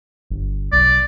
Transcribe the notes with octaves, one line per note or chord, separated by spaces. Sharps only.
G1
B1 D5